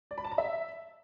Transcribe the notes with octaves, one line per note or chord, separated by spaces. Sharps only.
D5
B5
A5
A#5
E5